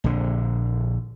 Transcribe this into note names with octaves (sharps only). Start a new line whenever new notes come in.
A#1 D3